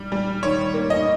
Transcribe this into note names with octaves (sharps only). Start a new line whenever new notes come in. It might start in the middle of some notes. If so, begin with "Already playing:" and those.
Already playing: G3
G3
D#3 C#5
A#3
D#5